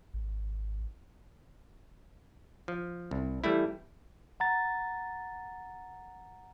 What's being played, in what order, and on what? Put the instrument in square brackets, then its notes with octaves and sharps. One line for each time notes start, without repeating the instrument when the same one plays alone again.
[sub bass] G#1
[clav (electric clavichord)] F3
C2
E3 G3 A3 E4
[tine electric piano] F#5 A#5 A6